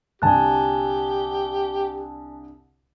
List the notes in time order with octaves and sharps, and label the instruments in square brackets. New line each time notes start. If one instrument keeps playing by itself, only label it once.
[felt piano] C2 D3 [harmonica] G4 [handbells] G#5 A5 F#6